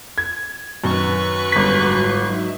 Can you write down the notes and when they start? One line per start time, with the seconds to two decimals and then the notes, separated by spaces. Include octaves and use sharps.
0.18 G#6
0.84 F#2 D#3 B4 C#6
1.52 G1 G#2 F#4 C6 B6
2.18 F#3 D#4 E5